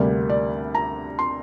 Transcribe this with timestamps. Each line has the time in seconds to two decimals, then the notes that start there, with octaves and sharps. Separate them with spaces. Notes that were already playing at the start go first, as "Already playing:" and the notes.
Already playing: D2 C3 G3 A#3 D5
0.30 D5
0.75 A#5
1.19 C6